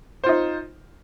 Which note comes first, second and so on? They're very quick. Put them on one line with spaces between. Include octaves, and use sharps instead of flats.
C5 F4 D#4